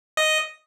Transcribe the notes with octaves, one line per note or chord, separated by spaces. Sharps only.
D#5